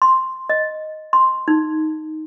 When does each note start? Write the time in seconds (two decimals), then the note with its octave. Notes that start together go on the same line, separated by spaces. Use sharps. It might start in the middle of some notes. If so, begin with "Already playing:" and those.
0.02 C6
0.50 D#5
1.13 C6
1.48 D#4